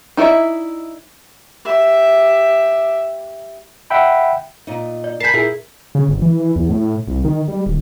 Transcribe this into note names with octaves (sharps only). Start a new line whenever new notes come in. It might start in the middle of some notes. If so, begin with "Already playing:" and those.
D#4 E4 A4 D5 E5
G4 E5
E5 F#5 G5 B5
A#2 D#4
D5
A#4 G#5 A5 B5 G6 B6 C7
A#2 E4 G#4 A#4
C#3
G1
E3
E3
E2
A2
C2
D#3
G3
D1